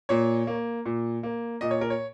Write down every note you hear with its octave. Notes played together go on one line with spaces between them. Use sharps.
A#2 C#5
A#3
A#2
A#3
A#2 D#5
C#5
A#4
C#5